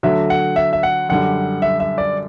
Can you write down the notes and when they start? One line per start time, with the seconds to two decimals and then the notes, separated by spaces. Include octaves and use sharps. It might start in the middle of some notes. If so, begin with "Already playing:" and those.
0.03 D3 F#3 A3 E5
0.30 F#5
0.56 E5
0.73 E5
0.83 F#5
1.09 F#2 D3 G3 F#5
1.62 E5
1.80 E5
1.98 D5